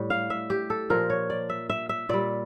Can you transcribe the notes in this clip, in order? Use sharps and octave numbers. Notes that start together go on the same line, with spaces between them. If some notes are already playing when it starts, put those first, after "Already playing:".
Already playing: A2 G3
F5
E5
G4
A4
A#2 F3 A#4
C#5
D5
E5
E5
E5
A#2 G3 D5